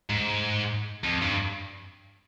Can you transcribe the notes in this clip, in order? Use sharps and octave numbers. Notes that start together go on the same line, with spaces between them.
G#2
F2
G2